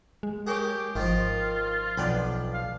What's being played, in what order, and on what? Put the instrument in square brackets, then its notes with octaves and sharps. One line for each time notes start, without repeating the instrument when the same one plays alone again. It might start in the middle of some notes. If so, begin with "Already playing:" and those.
[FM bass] G#3
[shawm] G4 [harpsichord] G#4 A#4 C#5
[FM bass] G#1 [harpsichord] D#3 F3 [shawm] F4
[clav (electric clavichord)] B1 F3 B3 [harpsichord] D4 G5 B5
[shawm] F5